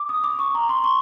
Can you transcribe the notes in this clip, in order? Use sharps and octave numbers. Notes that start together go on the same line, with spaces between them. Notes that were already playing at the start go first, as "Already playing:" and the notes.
Already playing: D6
D#6
D6
C#6
A#5
C6
C#6